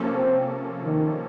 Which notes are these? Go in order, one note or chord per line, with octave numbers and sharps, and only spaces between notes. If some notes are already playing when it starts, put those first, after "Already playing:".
Already playing: C3 F3 A#3 C#4 A4
C4
D#3